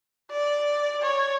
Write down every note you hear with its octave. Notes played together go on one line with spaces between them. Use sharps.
D5
C#5